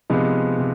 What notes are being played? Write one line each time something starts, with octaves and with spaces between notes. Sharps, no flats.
C3 F3 G#3 B3 D#4
C3